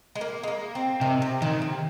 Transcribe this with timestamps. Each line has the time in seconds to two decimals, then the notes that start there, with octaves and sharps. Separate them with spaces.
0.15 G#3
0.21 A#3
0.43 G#3
0.48 A#3
0.75 C4
1.01 C3 D#3
1.22 C3
1.42 A#2 D#3
1.62 C3